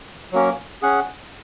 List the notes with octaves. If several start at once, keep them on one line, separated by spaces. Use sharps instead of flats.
F#3 A#3 C#4
C#4 G#4 F#5